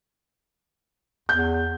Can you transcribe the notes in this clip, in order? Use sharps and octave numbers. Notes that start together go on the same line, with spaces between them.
E2 G6